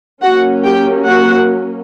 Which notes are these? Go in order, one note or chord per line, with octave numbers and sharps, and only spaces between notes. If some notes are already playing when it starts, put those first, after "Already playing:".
F#3 A#3 C#4 F#4 F#5
G4 G5
F#4 F#5